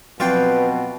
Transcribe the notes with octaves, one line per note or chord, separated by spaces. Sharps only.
B2 F3 F#3 C4 F4 B4 D5 G5